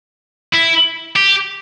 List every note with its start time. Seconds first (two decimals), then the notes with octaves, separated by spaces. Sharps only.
0.54 E4
1.16 G4